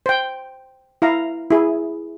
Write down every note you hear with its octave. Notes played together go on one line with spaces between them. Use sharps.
C5 G5
E4 F5 A#5
E4 G#4